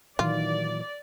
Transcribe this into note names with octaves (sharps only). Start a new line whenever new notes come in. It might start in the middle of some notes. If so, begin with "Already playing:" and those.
A#2 D#3 E3 F#3 F4 D5